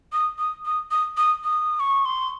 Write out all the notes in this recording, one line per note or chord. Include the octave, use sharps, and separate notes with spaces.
D#6
D#6
D#6
D#6
D#6
D#6
C#6
C6